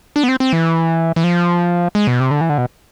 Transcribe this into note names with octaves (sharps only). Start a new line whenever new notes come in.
D4
B3
C4
C4
E3
E3
F3
G#3
B2
C3
D3
E3
D3
B2